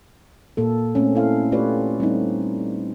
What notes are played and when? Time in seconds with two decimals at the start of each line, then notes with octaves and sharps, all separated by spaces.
0.57 A#2 A#3 A4
0.95 A3 C4 C#4
1.15 E4 A4 F5
1.52 A3 F4 G4 B4 C#5 D5
2.00 G3 C4 D#4